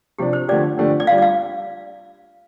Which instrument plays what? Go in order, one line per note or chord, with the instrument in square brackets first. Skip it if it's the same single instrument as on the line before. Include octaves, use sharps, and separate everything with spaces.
[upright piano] C3 F3 D4 [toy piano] G4
[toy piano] C5
[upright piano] D3 F3 A3 D4 G4 [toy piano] D5
[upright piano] D3 F3 A3 D4 G4
[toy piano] D5
[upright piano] G3 D4 F4 [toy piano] F5
[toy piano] D5
F5